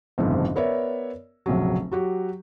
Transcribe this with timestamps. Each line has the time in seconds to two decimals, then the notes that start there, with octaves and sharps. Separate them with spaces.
0.18 F#1 B1 F2 G#2 D3 E3
0.56 B3 A#4 C#5 D5 E5
1.46 F1 A#1 C#3 F#3
1.92 F#3 F#4 G4